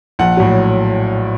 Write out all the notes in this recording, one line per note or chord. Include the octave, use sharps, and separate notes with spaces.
A#1 F#5
A2 F#3